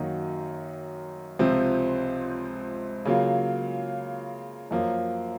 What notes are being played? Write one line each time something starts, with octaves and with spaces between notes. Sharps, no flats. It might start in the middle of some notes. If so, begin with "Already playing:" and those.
Already playing: F#2 D#3 A#3 D#4 F#4
C#2 C3 F3 C4
C#3 F#3 A#3 F4
F#2 F3 A#3